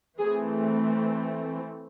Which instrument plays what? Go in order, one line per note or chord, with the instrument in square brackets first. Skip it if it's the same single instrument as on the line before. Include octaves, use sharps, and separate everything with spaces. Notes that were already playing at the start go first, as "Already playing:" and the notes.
[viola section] E3 A3 C4 G#4